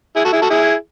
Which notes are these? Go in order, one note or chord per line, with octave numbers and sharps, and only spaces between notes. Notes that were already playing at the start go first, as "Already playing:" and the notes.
E4 G#4
F#4 A4
E4 G#4
F#4 A4
E4 G#4